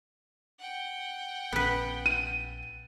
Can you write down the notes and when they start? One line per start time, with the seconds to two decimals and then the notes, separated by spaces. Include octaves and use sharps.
0.59 F#5 G5
1.53 A#1 B3 C#4 B4
2.06 D#7